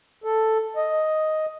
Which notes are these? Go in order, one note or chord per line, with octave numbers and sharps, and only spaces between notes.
A4
D#5